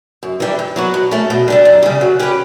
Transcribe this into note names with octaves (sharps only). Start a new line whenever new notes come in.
F#2
E3 G3 D4
G2
F#3 B3 F#4
B2
A3 C#4
B2
G3 D4 A4
F#2
C#3 G3
F#3
C#4 G4 B4